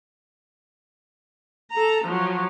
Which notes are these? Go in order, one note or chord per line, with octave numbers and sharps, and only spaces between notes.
A4 A#5
F3 F#3